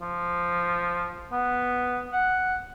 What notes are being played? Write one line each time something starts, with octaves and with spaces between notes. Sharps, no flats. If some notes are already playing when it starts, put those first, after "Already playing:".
F3
B3
F#5